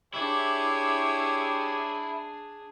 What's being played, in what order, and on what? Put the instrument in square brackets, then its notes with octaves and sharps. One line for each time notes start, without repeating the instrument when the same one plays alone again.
[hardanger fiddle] D4 G#4 [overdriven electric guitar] E4 [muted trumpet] G4 [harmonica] C#5 E5 D6